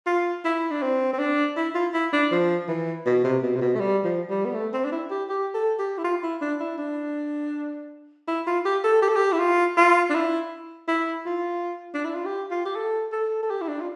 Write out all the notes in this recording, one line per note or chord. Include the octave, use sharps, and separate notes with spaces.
F4
E4
D4
C4
C4
D4
E4
F4
E4
D4
F3
E3
B2
C3
B2
C3
B2
A3
G3
F3
G3
B3
A3
C4
D4
E4
G4
G4
A4
G4
E4
F4
E4
D4
E4
D4
E4
F4
G4
A4
G4
A4
G4
E4
F4
F4
D4
E4
E4
F4
D4
E4
F4
G4
F4
G4
A4
A4
A4
G4
E4
D4
F4